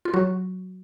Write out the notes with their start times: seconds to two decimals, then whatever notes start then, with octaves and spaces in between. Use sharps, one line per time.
0.05 F4
0.14 F#3 F#4